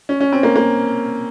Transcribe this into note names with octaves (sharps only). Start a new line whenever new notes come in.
C#4
C#4
C4
A#3
A#3